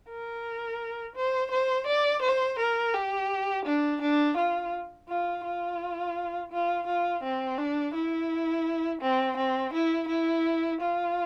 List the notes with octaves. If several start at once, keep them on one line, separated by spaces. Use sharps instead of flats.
A#4
C5
C5
D5
C5
A#4
G4
D4
D4
F4
F4
F4
F4
F4
C4
D4
E4
C4
C4
E4
E4
F4